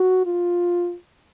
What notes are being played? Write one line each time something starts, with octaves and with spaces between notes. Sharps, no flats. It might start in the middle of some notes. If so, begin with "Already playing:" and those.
Already playing: F#4
F4